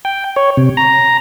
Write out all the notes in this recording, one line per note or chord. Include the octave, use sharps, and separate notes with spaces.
G5
C#5
C3
A#5